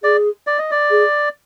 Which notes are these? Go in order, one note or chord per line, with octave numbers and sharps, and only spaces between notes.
G#4 D5
D5
D#5
D5
G#4